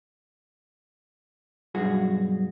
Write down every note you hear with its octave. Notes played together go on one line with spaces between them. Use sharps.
B1 G2 F#4 G#4